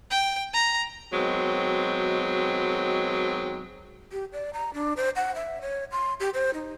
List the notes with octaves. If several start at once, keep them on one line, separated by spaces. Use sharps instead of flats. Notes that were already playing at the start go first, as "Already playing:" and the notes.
G5
A#5
B2 D#3 F#3 G#3 C4
G4
D5
A#5
D4
C5
F#5
E5
C#5
C6
G4
C5
D#4